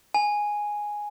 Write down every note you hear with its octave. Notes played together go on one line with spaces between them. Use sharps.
G#5